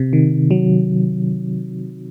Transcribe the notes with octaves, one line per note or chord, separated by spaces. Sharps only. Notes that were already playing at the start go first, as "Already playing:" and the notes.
Already playing: C3
D#3
F#3